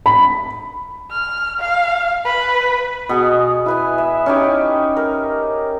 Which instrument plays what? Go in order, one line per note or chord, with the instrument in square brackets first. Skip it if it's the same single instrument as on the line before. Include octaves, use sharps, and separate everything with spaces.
[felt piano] B5
[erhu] F6
F5
B4
[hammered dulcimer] B2 G#4
E4 B4 G#5
E5
C#4 D#4 G4
A#4